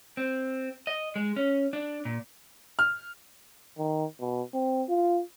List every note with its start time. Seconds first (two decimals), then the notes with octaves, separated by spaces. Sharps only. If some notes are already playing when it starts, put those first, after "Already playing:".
0.17 C4
0.87 D#5
1.16 G#3
1.36 C#4
1.73 D4
2.05 A#2
2.79 F6
3.78 D#3
4.20 B2
4.54 C4
4.89 F4